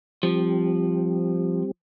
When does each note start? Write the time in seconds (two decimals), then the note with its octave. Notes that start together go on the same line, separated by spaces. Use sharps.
0.23 F3 G3 C4 G4